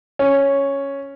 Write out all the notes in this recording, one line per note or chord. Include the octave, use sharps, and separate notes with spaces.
C#4